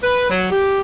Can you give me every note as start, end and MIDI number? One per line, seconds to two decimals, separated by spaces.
0.03 0.26 71
0.31 0.47 54
0.51 0.81 67